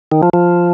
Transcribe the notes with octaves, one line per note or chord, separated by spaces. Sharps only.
D#3
F3
F3